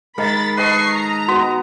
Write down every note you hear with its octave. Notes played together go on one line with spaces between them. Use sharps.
D#3 G#3 A#4 B5 A6
B4 D#5 A5 C#6 C7
A#5
B3 F#4